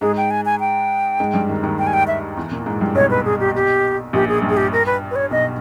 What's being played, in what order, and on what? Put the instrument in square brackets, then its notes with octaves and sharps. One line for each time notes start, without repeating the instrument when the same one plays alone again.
[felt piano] G#2 G#3 [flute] G#4
[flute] G5
G#5
G#5
G5
[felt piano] G#2 G#3
G2 G3
D#2 D#3
D#2 D#3
[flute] G5
G#5
G5
E5
[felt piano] E2 E3
A#2 A#3
G#2 G#3
G2 G3
[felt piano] B1 B2 [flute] C#5
[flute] B4
G#4
G4
G4
[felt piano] A#1 A#2 [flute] G4
[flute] G#4
[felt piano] G2
[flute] G#4
G4
A#4
B4
B4
C#5
[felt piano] B1 B2 [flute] D#5